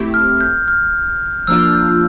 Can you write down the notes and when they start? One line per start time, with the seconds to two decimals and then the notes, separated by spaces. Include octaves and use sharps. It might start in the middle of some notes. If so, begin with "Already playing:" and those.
Already playing: A3 C4 E4 G4
0.14 F6
0.41 G6
0.68 F6
1.47 F3 A#3 D4 F4 E6
1.68 F6
1.75 G6